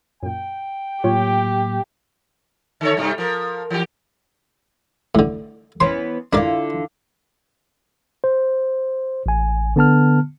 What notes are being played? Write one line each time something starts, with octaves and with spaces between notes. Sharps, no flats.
F#2 A#2 G5
A2 F#3 A#3 F4 G4 C#5
D3 A4 C#5
G2 C3 G3
F3 A#4
E3 G4
A2 D3
E3 B3 C#4 C6
D3 D4 E4 F4 A#4 D5
C5
A1 G#5
D3 B3 A5 F6